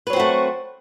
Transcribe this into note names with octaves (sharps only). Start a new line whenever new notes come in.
F#3 A3 C4 F#4 B4